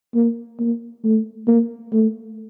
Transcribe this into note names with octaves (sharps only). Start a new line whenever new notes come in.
A#3
A#3
A3
A#3
A3